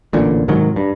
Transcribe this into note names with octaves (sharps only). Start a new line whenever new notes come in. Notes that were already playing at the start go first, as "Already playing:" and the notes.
A1 A#2 D3
G#2 C3 D#3 F#3
G2